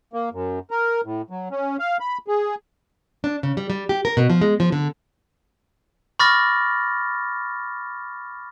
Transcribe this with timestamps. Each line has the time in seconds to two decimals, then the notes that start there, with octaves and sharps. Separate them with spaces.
0.13 A#3
0.32 F#2
0.71 A#4
1.05 A2
1.30 F#3
1.51 C#4
1.79 F5
2.00 B5
2.28 G#4
3.24 D4
3.43 C#3
3.57 G3
3.70 G3
3.89 G4
4.05 A#4
4.17 B2
4.30 F3
4.41 G#3
4.60 F3
4.72 D3
6.19 B5 C#6 D6 F6 A6 A#6